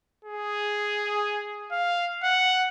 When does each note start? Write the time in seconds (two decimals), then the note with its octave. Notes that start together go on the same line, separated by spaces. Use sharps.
0.24 G#4
1.71 F5
2.23 F#5